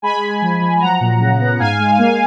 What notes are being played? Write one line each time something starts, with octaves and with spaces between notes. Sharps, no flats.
G#3 G#5 B5
G#3
F3
F3
F#3 F#5 A#5
A#2
C#3
B3
G#2 F5 G#5
G#3
A#3